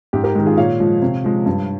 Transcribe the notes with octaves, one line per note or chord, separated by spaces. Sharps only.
G#2 G4
G4 A#4
D#3 G#3
F4 G#4
A#2 C#5 F5
F3 G#3
C3
F3 G#3
G2